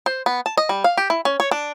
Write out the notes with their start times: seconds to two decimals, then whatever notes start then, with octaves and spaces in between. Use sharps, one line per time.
0.06 C5
0.26 B3
0.46 A5
0.57 D#5
0.69 G3
0.84 F5
0.97 G4
1.10 E4
1.25 C#4
1.40 C#5
1.51 D4